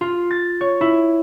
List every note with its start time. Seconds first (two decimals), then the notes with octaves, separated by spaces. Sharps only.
0.01 F4
0.31 A6
0.61 C#5
0.81 E4